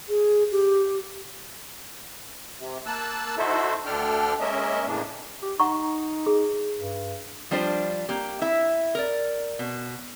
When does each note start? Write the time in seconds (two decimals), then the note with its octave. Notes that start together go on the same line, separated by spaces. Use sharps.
0.09 G#4
0.51 G4
2.59 C3
2.86 A#3 A5 E6 F#6
3.38 D#4 E4 F#4 A4 C5 E5
3.86 D2 D3 D4 A4 G5 F6
4.40 G#3 A#3 C#4 A#4 D#5 E5
4.86 A2 C#3 E3 A#3 D4
5.42 G4
5.60 D#4 F#5 A#5 C#6
6.26 G#4
6.78 G2
7.51 F3 G3 D4 F4 C5
8.09 A#3 G4
8.42 E4 E5
8.95 A#4 D5
9.59 B2